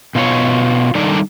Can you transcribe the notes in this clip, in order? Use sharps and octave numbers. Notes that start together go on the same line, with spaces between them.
B2 F4 A4 C#5
D#3 G3 D4 D#4 A4 D5